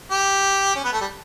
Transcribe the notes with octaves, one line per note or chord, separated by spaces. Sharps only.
G4
C#4
B3
A3
G3